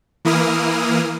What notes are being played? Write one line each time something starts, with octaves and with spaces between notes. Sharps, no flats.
E3 A#3 E4 D#6 F6